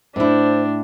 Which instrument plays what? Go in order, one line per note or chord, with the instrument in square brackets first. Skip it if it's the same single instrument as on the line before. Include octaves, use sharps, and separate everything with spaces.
[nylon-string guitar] A2 E4 [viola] D4 [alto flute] C5